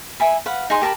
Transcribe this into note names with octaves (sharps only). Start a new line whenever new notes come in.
E5 G#5 B5
B4 F5 F#5
D#4 G#4 G#5 C6
G4 A#4 A5 B5